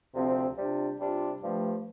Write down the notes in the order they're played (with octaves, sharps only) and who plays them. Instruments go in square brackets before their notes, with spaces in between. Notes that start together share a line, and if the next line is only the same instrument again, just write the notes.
[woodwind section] D2 C3 F3 C4
C3 G3 D4 F4
C3 G3 D4 F4
G2 F3 A3